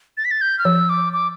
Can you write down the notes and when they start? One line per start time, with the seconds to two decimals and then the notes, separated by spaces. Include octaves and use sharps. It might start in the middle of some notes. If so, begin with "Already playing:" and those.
0.17 A6
0.25 B6
0.31 A6
0.41 G6
0.58 F6
0.65 F3 E6
0.89 D6
1.13 D6